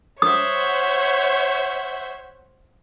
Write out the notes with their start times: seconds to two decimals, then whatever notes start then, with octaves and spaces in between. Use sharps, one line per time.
0.22 C5 C#5 E5 F#5 D#6